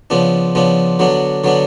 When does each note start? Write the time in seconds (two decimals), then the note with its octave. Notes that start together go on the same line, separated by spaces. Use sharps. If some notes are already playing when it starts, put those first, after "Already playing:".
0.10 C#3 F3 B3 D4
0.55 C#3 F3 B3 D4
0.99 D3 F#3 B3 D4
1.44 D3 F#3 B3 D4